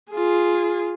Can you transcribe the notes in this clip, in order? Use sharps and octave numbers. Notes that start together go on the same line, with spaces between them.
F4 G#4